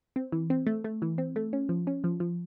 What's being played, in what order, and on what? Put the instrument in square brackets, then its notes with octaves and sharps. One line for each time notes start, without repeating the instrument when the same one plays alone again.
[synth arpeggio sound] C4
E3
C4
A3
A3
E3
C4
A3
C#4
F3
C#4
F3
F3